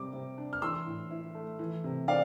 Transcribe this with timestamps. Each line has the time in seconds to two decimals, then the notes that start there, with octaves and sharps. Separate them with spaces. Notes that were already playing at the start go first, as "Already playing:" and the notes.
Already playing: C3 G3 D6
0.13 C3
0.38 D4
0.53 F6
0.62 E3 C6 E6
0.86 A2
1.11 E4
1.35 A3
1.59 E3
1.84 C3
2.08 C4 D5 F5